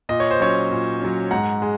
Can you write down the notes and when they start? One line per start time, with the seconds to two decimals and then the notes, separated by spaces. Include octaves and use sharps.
0.09 A#2 D#5
0.20 C#5
0.31 C5
0.40 F#3 C#4 C#5
0.71 A#2
1.01 F#3 C#4
1.31 G#2 F#5 A#5
1.62 G#3